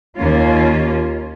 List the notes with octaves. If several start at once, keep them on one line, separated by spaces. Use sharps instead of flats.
D#2 A#3 C#4 F4